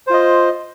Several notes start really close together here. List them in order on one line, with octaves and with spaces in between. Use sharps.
C5 F4 D#5